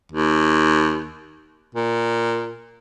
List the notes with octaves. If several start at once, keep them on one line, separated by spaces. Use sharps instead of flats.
D#2
A#2